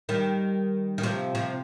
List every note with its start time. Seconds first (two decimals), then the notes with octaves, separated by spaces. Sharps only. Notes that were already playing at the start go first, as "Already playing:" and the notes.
0.09 D#3 G3
0.98 D#3
1.03 C3 F3
1.35 C3 F3